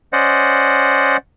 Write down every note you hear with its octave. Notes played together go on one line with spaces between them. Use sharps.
C#4 C5 D5 D#5 F#5